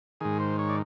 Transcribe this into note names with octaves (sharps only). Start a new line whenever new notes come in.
G#2 D#3 G#4
C5
C#5
D5